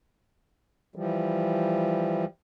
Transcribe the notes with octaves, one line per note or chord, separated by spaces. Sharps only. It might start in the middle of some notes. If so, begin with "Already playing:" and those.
E3 F3 G3